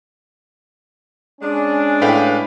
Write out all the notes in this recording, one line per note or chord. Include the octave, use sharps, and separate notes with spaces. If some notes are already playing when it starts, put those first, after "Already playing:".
G#3 C#4 D4
A2 B4 F5 G5